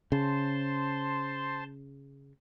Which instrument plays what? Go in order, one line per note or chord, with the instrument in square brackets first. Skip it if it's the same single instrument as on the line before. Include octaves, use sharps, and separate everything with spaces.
[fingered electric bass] C#3 [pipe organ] C5 A5 C6